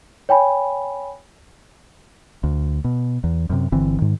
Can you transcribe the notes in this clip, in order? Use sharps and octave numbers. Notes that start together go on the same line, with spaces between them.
C#5 G5 G#5 B5
D2
B2
E2
F#2 C3
G1 D3 E3 C4
G#2 D#3